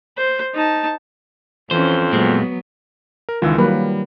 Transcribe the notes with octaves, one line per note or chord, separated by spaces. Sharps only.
C5
D#4 A5
F2 E3 C#4 C5
A#2 F#3 G#3 B3 C4
A#4
C#2 D#3 E3 F4 E6
F#3 G3 A#3 B4